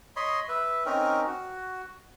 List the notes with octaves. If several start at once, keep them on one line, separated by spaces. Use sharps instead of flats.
C#5 D#5 B5 C6
B4 E5
C4 C#4 D#4 A#4
F#4